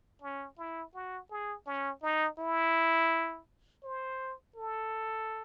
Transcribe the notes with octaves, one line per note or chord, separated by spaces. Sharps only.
C#4
E4
F#4
G#4
C#4
D#4
E4
C5
A4